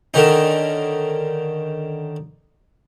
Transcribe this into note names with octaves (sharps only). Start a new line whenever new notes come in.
D3 D#3 C#4 D#4